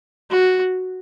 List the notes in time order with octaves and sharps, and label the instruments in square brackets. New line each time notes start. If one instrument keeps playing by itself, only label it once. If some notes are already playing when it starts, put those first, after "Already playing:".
[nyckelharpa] F#4